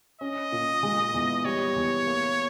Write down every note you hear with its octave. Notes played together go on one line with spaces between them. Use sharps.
C#4 D#5
A#2
G#3
E2
G3 C#5
E2
A#3